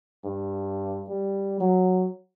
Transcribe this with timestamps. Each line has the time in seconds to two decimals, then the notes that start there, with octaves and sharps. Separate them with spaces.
0.24 G2
1.08 G3
1.60 F#3